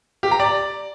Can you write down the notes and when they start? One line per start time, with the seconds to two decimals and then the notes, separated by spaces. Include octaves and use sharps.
0.23 G4
0.31 A#5
0.40 D5